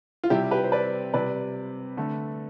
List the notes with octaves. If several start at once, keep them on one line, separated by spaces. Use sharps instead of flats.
F4
C3 G3 E4 G4
G4 B4
C5
B4 D5
C3 G3 B4 D5
D3 A3